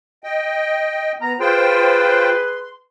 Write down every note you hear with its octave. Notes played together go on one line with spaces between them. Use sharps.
D#5 G5
B3 A#5
F4 G#4 B4 C5 G5 C6